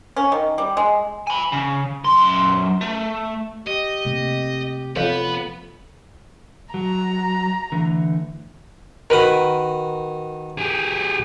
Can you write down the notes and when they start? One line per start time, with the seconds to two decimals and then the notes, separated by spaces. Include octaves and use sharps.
0.17 C#4
0.32 D#3
0.58 G3
0.77 G#3
1.27 G#5 B5
1.52 C#3
2.04 F#2 C6
2.81 A3
3.67 G4 D#5
4.05 C3 A3 A#3
4.96 F3 B3 C4 F4 A4 B4 C#5 F5
6.74 F#3 A#5
7.72 D3 E3 A3
9.10 D#3 F#4 A#4 B4
10.58 G4 G#4